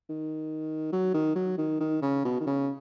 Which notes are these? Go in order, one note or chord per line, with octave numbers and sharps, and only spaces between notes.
D#3
F#3
D#3
F#3
D#3
D#3
C#3
B2
D#3
C#3